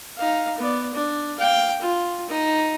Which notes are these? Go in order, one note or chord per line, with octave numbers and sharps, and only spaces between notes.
D#4 F5
B3 D5
D4
F5 G5
F4
D#4